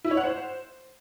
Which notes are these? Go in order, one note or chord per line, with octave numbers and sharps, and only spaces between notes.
E4
C#5
F#5
C5